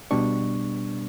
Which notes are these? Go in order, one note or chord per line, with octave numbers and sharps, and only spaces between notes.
B2 G3 B3 D4 C#6